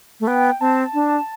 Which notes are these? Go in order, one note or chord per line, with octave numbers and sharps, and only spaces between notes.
A3
B3 G5
C4 A5
D4